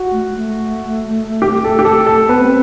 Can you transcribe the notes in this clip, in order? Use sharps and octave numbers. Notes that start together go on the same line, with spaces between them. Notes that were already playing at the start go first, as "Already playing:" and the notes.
Already playing: F#4
A3
A3
G4
A4
G4
A4
A4
B3 B4
C4